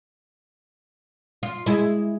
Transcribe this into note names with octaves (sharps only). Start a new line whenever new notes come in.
F4
G#3 E4